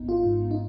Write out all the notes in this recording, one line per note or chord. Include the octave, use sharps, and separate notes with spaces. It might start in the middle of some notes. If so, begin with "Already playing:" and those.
Already playing: G#1 B3 D#4
F4
G#2
D#4